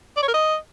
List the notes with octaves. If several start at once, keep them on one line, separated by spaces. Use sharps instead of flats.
D5
C#5
A#4
D#5